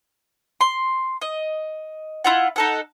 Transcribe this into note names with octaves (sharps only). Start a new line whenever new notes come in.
C6
D#5
E4 F4 F#5
D#4 A4 F#5